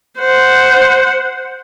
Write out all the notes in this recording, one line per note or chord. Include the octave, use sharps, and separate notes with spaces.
C5 F#5